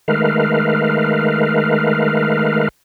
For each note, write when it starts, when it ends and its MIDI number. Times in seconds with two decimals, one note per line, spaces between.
0.08 2.68 51
0.08 2.68 56
0.08 2.68 57
0.08 2.68 70
0.08 2.68 71
0.08 2.68 77